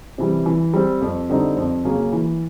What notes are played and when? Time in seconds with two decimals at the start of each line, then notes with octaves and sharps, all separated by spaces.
0.18 C3 E3 G3
0.46 E3
0.74 G3 C4
1.02 F2
1.30 D3 G3 C4 D#4
1.57 F2
1.84 C#3 F#3 A#3 C#4
2.13 E3